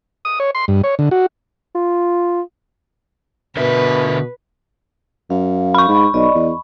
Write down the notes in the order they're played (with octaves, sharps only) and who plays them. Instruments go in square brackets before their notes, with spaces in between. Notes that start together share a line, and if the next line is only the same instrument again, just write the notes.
[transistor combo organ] D#6
C#5
C6
G2
C#5
D3
F#4
[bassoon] F4
[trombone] B2 [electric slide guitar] D3 A#4 E5 [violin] B4
[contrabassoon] F#2 [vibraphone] F5
[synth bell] B5 C#6
[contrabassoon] G#2
[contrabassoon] B1 [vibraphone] D5 D#5
[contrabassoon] E2